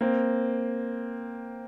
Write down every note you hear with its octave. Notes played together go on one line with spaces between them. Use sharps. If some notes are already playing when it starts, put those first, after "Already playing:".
A#3 C4